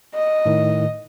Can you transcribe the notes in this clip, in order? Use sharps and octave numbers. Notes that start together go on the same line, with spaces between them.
D#5
A2 D#3